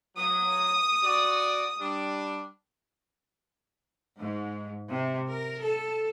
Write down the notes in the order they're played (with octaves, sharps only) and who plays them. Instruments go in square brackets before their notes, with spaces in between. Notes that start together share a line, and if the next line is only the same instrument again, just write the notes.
[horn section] F#3 [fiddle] D#6
[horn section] F#4 D5
G3 D4
[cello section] G#2
C3
A#4
A4